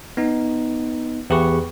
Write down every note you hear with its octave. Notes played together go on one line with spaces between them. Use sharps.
B3 D#4
E2 G4 G#4 B4 C#6